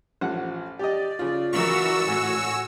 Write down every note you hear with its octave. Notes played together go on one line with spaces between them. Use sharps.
A1 F3 F#5
G4 D5 D#5
C#3 F4
E3 F#4 A#4 C#6 E6
A2 F#4 F#5 G#5